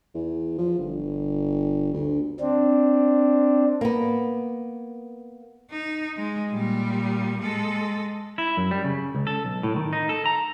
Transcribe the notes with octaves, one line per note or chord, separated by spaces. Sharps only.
E2
F3
G1
D2
C4 D4
A#3 B3
D#4
G#3
A#2 G3
G#3 A4
E4
F#2
G3
C#3
C#2
A4
B1
A2
D#3
D#4
A4
A#5